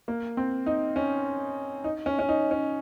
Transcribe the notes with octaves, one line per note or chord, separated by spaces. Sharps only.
A#3
C4
D#4
C#4
D#4
C#4
C#4
D#4
C#4